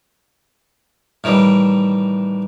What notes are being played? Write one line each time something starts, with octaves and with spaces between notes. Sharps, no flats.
A2 D#3 E3 G3